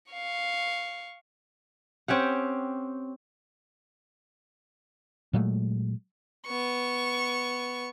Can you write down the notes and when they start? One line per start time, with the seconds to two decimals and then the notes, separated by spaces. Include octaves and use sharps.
0.12 F5 C#6
2.08 C4 C#4 G4 F#5
5.33 A#2 F#3 G#3 A3
6.46 B3 C#6